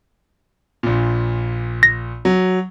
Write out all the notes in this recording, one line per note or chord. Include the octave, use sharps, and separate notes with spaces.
A#1 A#2
A#6
F#3